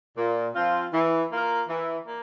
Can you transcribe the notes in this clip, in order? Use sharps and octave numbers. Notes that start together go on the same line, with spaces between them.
A#2
F3 C4 F4
E3
A#3 F4 A#4
E3
A#3